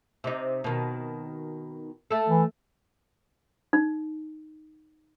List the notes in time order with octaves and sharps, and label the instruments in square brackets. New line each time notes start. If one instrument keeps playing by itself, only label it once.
[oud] C3 D#4
B2 D#3
A3 A4
[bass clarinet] E3
[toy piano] D#4